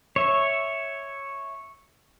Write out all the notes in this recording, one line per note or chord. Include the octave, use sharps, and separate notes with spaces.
C#5 E5